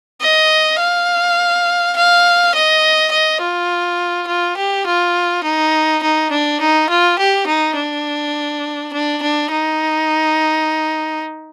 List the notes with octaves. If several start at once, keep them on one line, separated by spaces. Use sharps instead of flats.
D#5
F5
F5
D#5
D#5
F4
F4
G4
F4
D#4
D#4
D4
D#4
F4
G4
D#4
D4
D4
D4
D#4